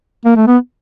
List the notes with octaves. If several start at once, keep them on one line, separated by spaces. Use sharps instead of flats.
A#3
A3
B3